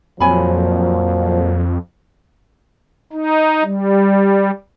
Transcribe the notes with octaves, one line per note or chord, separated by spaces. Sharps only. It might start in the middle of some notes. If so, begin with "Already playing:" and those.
F2 A#2 F3 F#3 C#5 G#5 B5
D#4
G3